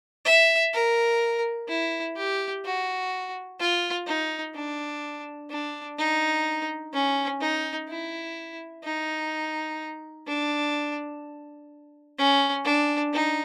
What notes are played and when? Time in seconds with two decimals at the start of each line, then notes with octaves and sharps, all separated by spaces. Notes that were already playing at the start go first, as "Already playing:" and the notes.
0.25 E5
0.73 A#4
1.69 E4
2.16 G4
2.64 F#4
3.59 F4
4.07 D#4
4.55 D4
5.50 D4
5.98 D#4
6.93 C#4
7.41 D#4
7.89 E4
8.84 D#4
10.27 D4
12.18 C#4
12.65 D4
13.13 D#4